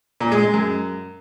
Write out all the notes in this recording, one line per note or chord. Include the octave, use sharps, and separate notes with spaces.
A#2
G#3
G#3
F#2